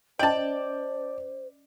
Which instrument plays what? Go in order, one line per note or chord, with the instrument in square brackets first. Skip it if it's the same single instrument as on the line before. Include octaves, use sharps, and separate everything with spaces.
[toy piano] C#4 D#5 [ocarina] C5 [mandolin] D5 [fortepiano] G5 A5